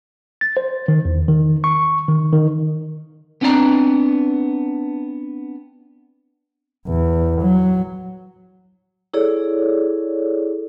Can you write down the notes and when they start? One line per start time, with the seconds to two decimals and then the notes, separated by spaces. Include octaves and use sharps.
0.41 A6
0.57 C5
0.88 D#3
1.05 E2
1.28 D#3
1.64 C#6
2.09 D#3
2.33 D#3
3.41 B3 C4 D4 B4 D5 A#5
6.88 E2
7.42 F#3
9.14 E4 G#4 A4 C#5 D5